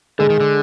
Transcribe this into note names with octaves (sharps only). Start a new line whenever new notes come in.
D3 G#3
D#3
D3